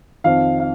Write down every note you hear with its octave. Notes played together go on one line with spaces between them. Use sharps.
F2 D#3 F5
F5